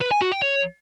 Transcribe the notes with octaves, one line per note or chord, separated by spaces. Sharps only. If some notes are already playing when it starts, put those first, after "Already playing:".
B4
G#5
F#4
G5
C#5